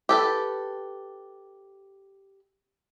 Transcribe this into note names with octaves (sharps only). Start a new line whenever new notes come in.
G4 A4 B4